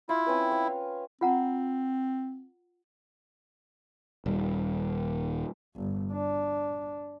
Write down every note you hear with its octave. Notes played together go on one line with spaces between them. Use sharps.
E4 F4
C4 C#4 B4
C#5 F5
C4 F4 F#5 A#5
D#1 G3
G1
D4